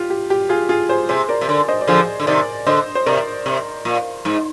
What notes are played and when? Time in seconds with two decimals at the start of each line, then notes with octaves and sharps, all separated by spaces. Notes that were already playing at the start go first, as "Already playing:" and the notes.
Already playing: F4 G4
0.10 G4
0.30 G4
0.49 F4 G#4
0.69 F4 G#4
0.89 G#4 C5
1.09 C3 G#4 C5
1.29 A#4 D5
1.41 C3
1.48 D3 A#4 D5
1.68 C5 D#5
1.81 D5
1.87 D3 F3 G#4 C5
2.20 D3
2.27 C3 D#3 A#4 D5
2.66 D3 C5 D#5
2.95 C5
3.06 C3 A#4 D5
3.46 C3
3.85 A#2
4.25 G#2